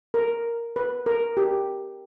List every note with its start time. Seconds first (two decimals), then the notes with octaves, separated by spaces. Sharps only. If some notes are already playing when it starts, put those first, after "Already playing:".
0.14 A#4
0.76 B4
1.06 A#4
1.37 G4